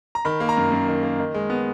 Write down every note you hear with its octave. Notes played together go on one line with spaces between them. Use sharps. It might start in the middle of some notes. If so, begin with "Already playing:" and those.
A#5
D#3 B5
A#3
A#5
F#2
F#2
D#3
A#3
D#3
G#3
B3